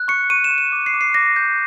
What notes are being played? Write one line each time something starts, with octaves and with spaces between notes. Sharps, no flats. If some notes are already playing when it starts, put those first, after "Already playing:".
Already playing: F#6
C#6 C#7
C#6 D#7
E7
C#6
E7
D6
C7
D6
C7
D6 A#6
G6